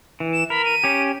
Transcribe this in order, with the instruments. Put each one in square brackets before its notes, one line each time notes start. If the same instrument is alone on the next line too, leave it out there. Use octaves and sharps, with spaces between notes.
[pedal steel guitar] E3
[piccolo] E7
[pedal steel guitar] A#4 [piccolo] B5
[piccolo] D#7
[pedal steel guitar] C#4 G4